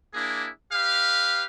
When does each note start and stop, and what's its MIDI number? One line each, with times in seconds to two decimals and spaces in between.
0.13 0.48 58
0.13 0.48 62
0.13 0.48 64
0.13 0.48 68
0.72 1.44 67
0.72 1.44 71
0.72 1.44 77